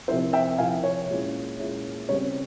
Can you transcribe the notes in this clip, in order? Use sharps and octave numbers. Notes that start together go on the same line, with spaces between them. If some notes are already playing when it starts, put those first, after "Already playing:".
C3 F3 C4 E4 C5 E5
E5 G5
C3 F3 C4 E4 F5 G#5
C#5
A#2 G#3 C#4 E4
A#2 G#3 C#4 E4
C#3 G3 C4 C#5